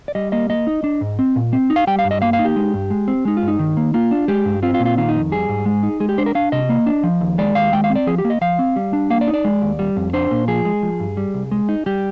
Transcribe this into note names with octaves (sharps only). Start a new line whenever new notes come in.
D5
G3 D#5
A#3 D#5
A#3 D#5
D#4
D4
G#2
C4
A#2
C4
D#4
F5
G3 G5
F5
G2
D#5
A#3 F5
F5
D#4
G4
G#3
G2
G#3
C4
G#3 D#4
F4
G2
D#4
D#3
A#3
A#3 F4
D4
G#3 G4
G2
C4 F4
F4
A#2
F4
D#3 F4
D#4
F2
G3 G#4
G#2
G#3
D#4
G#3 G#4
G4
D4 C5
A#4
D4 F5
C3 D#5
A#3
D4
F3
D#2
G#3 D5
D#2 F5
G#3 G5
F5
C4
D5
F3 G#4
G4
A#3
D#5
F3 F5
C4
G3
D4
A#3 F5
D5
D#4
D5
G#3
D#2
G3
F2
D4 C5
A#2
F3 G#4
G#3
F3
G2
G3
C2
G#3
D#4
G3 G4